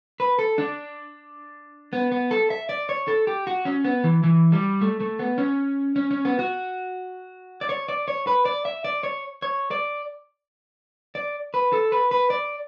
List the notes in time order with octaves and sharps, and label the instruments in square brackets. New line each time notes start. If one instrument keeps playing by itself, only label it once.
[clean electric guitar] B4
A4
D4
B3
B3
A4
E5
D5
C#5
A4
G4
F#4
C#4
B3
E3
E3
G3
A3
A3
B3
C#4
C#4
C#4
B3
F#4
D5
C#5
D5
C#5
B4
D5
E5
D5
C#5
C#5
D5
D5
B4
A4
B4
B4
D5